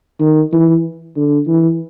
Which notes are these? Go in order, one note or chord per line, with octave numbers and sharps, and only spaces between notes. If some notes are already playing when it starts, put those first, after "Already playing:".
D#3
E3
D3
E3